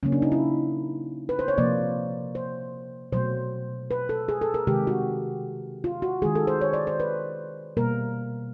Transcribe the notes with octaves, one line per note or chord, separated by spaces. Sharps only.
C#3 F#3 A#3 C#4
D4
D#4
E4
B4
C5
C#5
C3 F3 A#3 D5
C5
B2 F#3 A3 C5
B4
A4
G#4
A4
A#4
C3 D#3 G#3 G4
F#4
F4
F#4
D#3 G#3 G#4
A4
C5
C#5
D5
C5
B4
B2 G3 A#3 A#4